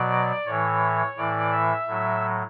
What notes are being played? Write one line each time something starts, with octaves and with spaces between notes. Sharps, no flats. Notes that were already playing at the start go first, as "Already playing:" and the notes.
Already playing: B2 F#3 D5
A2 E3 C#5
A2 E3 D5
E5
A2 F#3